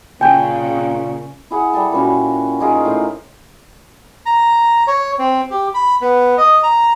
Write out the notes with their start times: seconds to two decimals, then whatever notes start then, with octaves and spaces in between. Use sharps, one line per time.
0.21 A#2 C#3 G5 G#5 G6
1.51 E4 G#4 F#5
1.73 G3 A4 A5
1.93 A#2 C#4 F#4
2.60 D#4 F4 G#4 A#4
2.85 A2 C5
4.26 A#5
4.87 C#5
5.19 C4
5.51 G4
5.74 B5
6.01 B3
6.38 D#5
6.63 A#5